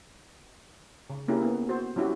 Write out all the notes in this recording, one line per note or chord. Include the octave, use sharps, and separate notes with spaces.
C#3
A#3 C#4 E4 G4 G#4 A#4
B3
F#4 C5
F#3 C#4 E4 F#4 G4